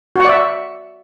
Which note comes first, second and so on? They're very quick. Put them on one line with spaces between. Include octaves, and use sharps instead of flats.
F#4 F#5 D5 E5